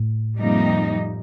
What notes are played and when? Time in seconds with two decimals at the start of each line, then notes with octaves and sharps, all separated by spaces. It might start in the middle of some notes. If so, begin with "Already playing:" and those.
Already playing: A2
0.38 F2 C3 G3 A#3 D#4